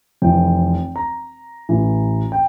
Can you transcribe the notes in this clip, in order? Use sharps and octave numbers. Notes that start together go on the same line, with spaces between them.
F1 F2 E3 G5
A#5
A1 A2 E3
G5